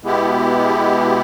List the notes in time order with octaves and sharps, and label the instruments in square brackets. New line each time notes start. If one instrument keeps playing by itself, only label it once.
[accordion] B2 G#3 B3 E4 G4